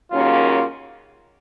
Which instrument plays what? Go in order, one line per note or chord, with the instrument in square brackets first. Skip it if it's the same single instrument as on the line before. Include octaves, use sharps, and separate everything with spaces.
[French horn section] D#2 C#3 F#3 A#3 C#4 [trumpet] F4